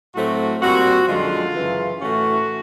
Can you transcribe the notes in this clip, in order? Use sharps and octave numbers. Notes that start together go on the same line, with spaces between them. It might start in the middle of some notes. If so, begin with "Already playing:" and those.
A2 F#3 A3 C4 F#4
A#2 G3 C4 F#4
F#2 D3 F3 G#3 F4
F#2 C#3 E3
A2 E3 A3 C#4 F#4